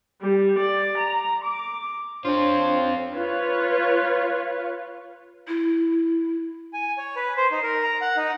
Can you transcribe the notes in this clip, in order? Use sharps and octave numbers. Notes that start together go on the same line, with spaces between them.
G3
D5
A#5
D6
C4 D4 F4 C5 C#5
F4 B4 C#5
E4
G#5
C#5
B4
C5
D#4
A#4
A#5
F#5
D#4